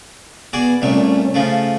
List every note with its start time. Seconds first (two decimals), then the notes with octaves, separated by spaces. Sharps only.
0.53 B3 F#4 G#4 D5
0.82 C2 A#2 A3 C#4
1.34 C#3 F3 A3